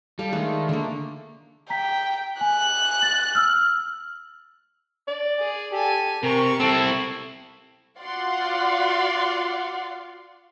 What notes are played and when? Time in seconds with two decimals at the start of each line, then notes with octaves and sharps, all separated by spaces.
0.19 G3 A4 F5
0.33 D#3 G#3 A3 D4
0.69 D3 A3 A#3
1.70 G5 A#5 B6
2.41 G#5 F#6
3.02 A6
3.35 E6 F6
5.08 D5
5.39 G#4
5.72 G4 A4 G#5
6.23 C3 G4 A#4 C#6
6.60 C4 E4 A4
8.00 F4 F#4 D5 F5 F#5 C6